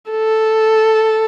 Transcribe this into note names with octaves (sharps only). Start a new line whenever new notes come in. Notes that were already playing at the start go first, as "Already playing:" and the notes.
A4